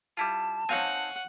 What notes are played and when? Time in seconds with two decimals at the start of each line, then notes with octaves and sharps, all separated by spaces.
0.17 G3 E4 F4 A5
0.69 C4 D#4 C#5 F5 F#5 G#5